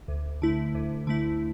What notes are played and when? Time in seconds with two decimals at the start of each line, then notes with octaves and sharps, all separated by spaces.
0.08 D2
0.42 D3 A3 E4
0.75 D2
1.07 D3 A3 E4